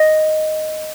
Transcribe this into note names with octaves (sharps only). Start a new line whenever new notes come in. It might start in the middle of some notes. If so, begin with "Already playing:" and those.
Already playing: D#5